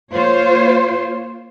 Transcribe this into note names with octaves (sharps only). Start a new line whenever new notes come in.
A#3 F4 C5 C#5